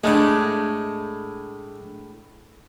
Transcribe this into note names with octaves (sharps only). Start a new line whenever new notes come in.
A2 G#3 A3 D4